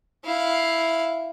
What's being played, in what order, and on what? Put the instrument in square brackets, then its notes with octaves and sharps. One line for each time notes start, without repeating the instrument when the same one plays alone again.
[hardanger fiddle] E4 F5